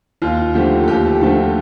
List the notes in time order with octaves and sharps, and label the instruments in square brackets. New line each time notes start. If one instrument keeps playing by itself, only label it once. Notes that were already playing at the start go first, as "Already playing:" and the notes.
[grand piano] D#2 F4
D3 F3 A3 G4
A4
D#2 G4
D3 F3 A3 A4